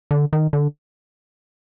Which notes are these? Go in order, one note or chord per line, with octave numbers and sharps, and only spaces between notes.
D3
D#3
D3